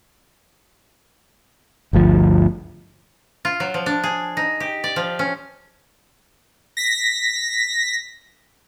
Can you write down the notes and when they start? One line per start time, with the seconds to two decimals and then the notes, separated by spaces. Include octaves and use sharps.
1.93 G1 D2 F3
3.45 F4
3.60 F#3
3.74 F3
3.86 D4
4.04 G#4
4.37 D#4
4.60 G4
4.84 D5
4.96 F3
5.19 C#4
6.77 A#6 B6